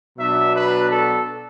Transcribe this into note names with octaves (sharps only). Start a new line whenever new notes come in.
B2 F#3 B3 D4 E5
B4
A4